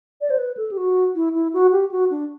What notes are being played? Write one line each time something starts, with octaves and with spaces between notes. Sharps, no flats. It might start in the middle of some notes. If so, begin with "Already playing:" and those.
D5
C5
B4
A4
G4
F#4
E4
E4
F#4
G4
F#4
D4